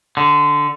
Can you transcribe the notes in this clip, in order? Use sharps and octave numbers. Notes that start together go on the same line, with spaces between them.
D3